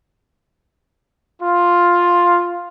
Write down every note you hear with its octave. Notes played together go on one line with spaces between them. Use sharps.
F4